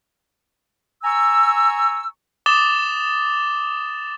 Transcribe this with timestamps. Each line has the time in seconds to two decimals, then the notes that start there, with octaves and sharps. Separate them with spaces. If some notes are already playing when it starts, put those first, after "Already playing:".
1.04 G#5 A#5 C#6 E6
2.46 D6 D#6 A6 E7 G7